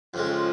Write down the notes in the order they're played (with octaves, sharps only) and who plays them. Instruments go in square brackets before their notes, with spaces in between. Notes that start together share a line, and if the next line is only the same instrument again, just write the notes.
[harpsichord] F2 C#3 G#3 [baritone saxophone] F3